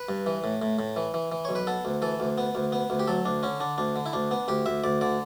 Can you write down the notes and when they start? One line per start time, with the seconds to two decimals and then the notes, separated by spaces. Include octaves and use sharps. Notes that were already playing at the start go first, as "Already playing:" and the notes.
Already playing: B4
0.09 G2
0.26 E3
0.44 A2
0.62 A2
0.79 A2
0.96 E3
1.14 E3
1.32 E3
1.45 B1 C#5
1.55 B4
1.67 B3 A4
1.85 D2
2.02 E3 A4
2.20 D2
2.38 B3
2.55 D2
2.72 B3
2.90 D2
3.00 G4
3.08 F#3 A4
3.25 D2 D4
3.43 D3 C#4
3.60 D3 D4
3.78 D2 D4
3.96 D3
4.06 E4
4.13 D2 D4
4.31 B3
4.48 D2 G4
4.66 D2 E5
4.84 D2 D5
5.01 D3 D5